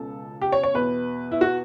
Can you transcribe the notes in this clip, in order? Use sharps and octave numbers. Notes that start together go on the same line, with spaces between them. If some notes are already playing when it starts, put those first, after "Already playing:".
Already playing: C#2 B2 A4
G4
C#5
C#5
E2 B2 B4
E4
F#4